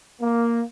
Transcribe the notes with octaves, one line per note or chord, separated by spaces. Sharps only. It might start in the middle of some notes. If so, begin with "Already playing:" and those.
A#3